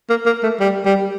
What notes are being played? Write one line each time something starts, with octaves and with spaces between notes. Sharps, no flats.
A#3
A#3
A3
G3
G3